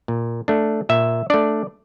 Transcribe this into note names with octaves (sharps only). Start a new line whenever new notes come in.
A#2
A3 D4
A#2 E5
A3 D4 D5